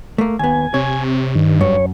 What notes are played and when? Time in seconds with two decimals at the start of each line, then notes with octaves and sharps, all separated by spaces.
0.18 A3 A#3
0.39 D#2 B3 G#5
0.74 C3 C#5
1.35 G2 D#3
1.61 F#2 C#5